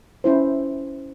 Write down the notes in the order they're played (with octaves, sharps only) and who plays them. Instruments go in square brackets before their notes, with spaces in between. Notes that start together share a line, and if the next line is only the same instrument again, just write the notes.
[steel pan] C#4 E4 C5